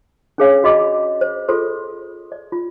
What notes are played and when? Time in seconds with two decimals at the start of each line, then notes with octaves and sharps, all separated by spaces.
0.38 C#4 D4 G#4 C#5 F5 G#5
0.64 F#4 G#4 D5 D#5 B5 D6
1.21 C5
1.48 F4 G#4 A4 C5 C6
2.32 D5
2.52 F4